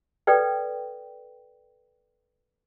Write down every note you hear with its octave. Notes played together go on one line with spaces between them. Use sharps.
A4 B4 D5 G5